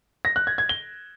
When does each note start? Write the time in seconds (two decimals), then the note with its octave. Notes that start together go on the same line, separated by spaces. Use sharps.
0.25 A#6
0.36 F#6
0.47 G#6
0.58 G#6
0.69 G7